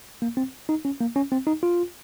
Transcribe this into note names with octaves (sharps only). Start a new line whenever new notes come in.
A#3
C4
D#4
C#4
A#3
C#4
C4
D#4
F4